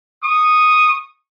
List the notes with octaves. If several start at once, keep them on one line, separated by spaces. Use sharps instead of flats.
C#6 D#6